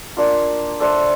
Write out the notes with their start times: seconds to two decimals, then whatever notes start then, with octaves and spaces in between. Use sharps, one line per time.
0.17 A#3 D4 F4
0.80 D4 A4 C5 E5